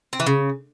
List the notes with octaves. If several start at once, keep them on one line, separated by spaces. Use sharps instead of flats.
C4
E3
C#3